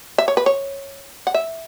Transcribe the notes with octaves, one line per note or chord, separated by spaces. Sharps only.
E5
C#5
B4
C#5
F#5
E5